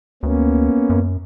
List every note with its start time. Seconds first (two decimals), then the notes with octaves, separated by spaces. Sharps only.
0.23 D2 A#3 B3 C#4
0.90 F#2